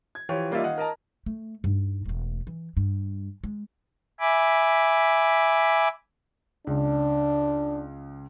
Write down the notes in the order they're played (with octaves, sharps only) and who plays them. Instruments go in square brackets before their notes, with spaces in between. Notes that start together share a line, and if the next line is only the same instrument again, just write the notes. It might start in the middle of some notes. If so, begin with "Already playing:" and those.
[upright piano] G#6
E3 F3 F4 G4 C#5
G3 A#3 D#4 F4 D5 E5
D#3 D#5 F5 F#5
A#4 D#5 A5 A#5
[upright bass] A3
G2 D#4
E1 A3
E3
G2
G#3
[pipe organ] E5 G#5 B5 D6
[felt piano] C#2 [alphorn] D4